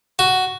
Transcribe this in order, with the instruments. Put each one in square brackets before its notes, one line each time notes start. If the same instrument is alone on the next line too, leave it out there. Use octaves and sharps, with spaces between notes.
[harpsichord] F#4